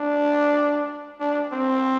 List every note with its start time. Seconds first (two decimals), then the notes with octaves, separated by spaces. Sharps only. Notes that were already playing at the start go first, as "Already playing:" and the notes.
Already playing: D4
1.20 D4
1.52 C4